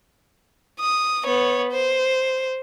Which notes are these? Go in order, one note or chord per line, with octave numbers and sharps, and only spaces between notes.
D#6
B3 C#5
C5